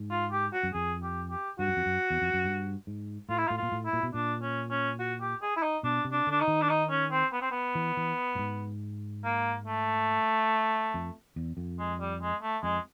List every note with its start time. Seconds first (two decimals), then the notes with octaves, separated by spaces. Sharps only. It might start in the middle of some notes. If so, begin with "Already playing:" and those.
Already playing: G#2
0.11 F4
0.32 G4
0.54 F#4
0.63 F#2
0.74 F2 G#4
1.03 G4
1.31 G4
1.59 G2 F#4
1.68 F#2
1.77 F2
1.86 F#2
2.10 E2
2.22 F2
2.34 F#2
2.45 G2
2.87 G#2
3.29 A2 F4
3.38 E4
3.48 F4
3.50 A2
3.58 A#2 F4
3.72 A2
3.86 E4
3.93 A#2
4.03 B2
4.14 A#2 D4
4.42 C#4
4.71 C#4
4.99 F#4
5.21 G4
5.42 G#4
5.57 E4
5.63 D#4
5.83 B2 D4
6.05 C3
6.12 D4
6.27 D3 D4
6.41 D#4
6.48 D#3
6.62 D4
6.69 D#4
6.90 C#4
7.12 C4
7.33 B3
7.42 C4
7.51 B3
7.75 E3
7.97 E3
8.35 A2
8.39 G#2
9.24 A#3
9.66 A3
10.94 F2
11.36 E2
11.57 F2
11.79 G#3
12.00 G3
12.21 G#3
12.43 A3
12.63 F2 G#3